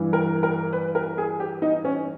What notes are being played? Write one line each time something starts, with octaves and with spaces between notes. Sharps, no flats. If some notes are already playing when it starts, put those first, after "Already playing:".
Already playing: G2 E3
A#4
A#4
B4
A#4
G#4
G4
D#4
C#4